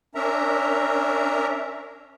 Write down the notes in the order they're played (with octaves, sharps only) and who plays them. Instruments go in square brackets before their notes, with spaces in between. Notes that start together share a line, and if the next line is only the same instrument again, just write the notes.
[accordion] C#4 D4 A#4 E5 A#5